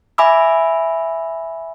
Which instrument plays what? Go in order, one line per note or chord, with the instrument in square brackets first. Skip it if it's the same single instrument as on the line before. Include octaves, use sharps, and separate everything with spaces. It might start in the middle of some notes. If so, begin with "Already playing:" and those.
[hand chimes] E5 G#5 B5 D6 E6